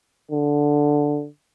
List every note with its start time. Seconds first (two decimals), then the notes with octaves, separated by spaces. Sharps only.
0.31 D3